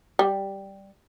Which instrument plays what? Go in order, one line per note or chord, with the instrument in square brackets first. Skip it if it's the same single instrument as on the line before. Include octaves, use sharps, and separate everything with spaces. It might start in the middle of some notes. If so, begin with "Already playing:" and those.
[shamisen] G3